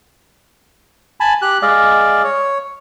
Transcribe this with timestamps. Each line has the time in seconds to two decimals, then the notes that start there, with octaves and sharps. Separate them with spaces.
1.20 G#5 A5 B5
1.42 G4 F#6
1.62 G#3 D5 D#5 F5
2.24 C#5